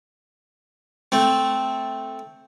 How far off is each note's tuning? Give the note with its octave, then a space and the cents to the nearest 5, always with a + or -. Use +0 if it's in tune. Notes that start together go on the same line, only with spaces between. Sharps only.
A3 +0 C4 +0